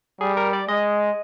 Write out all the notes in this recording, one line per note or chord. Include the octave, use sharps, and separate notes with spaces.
G3 G#4
A#4
D5
G#3 D#5